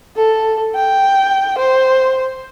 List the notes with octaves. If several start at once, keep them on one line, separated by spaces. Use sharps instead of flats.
A4
G5
C5